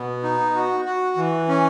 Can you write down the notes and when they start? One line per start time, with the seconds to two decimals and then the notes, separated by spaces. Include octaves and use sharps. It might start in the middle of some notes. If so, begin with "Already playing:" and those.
Already playing: B2 B3
0.23 D#4
0.55 F#4
0.85 F#4
1.17 E3
1.48 C#4